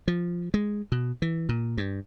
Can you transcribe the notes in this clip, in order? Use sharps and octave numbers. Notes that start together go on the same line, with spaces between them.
F3
G#3
B2
E3
A#2
G2